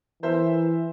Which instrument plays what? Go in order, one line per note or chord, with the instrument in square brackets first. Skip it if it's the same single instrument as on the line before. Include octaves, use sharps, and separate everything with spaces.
[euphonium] E3 [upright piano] A#4 C5 E5